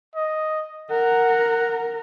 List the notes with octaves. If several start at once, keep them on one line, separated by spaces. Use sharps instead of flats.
D#5
A#4 F#5